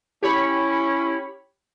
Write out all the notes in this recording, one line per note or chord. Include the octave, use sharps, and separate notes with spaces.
C#4 E4 G4 C#5 B5